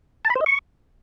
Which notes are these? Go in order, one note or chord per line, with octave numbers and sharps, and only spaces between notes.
A5
B5
C5
D#5
C#6